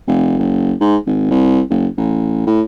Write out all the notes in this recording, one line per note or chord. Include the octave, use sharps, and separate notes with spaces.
F1
F#1
G#2
G#1
C2
F#1
A1
A2